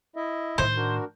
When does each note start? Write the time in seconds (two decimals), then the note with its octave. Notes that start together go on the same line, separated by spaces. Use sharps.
0.16 E4 D#5 E5
0.58 A2 D#3 C5
0.76 D4 F#4 A#4